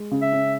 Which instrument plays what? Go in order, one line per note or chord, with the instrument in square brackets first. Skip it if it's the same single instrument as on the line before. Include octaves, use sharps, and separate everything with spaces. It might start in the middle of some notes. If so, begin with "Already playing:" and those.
Already playing: [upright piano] G#3
C#3
[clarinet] E5
[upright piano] C#4